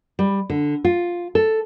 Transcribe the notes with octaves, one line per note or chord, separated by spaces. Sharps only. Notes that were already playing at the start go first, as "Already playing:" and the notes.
G3
D3
F4
A4